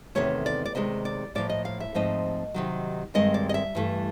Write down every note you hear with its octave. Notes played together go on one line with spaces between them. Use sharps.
E2 C3 D#3 A3 C#5
D5
D5
C3 D#3 G#3 D#5
D5
A2 F3 A#3 D5
D#5
F5
E5
G#2 F3 A3 C4 D#4 D#5
C3 D#3 F#3
G2 D#3 G#3 C4 D#5
D5
D#5
E5
G2 E3 A3